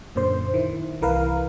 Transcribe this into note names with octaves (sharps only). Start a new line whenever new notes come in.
F#2 A#2 D3 C5 C6
D#3 E4
C2 E3 A#4 B4 F5